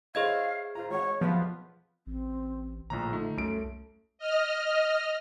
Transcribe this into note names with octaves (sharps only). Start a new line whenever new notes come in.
E4 G#4 C5 C#5 D#5 F5 G#6
F4 C5 A#5
G#1 C#5 F#5
B1 F2 F3 B3 B4
A1 C4
A#1 A2 D3 F4 A#5
A3 D#4
C2 F#2 A3 D7
D#5 F6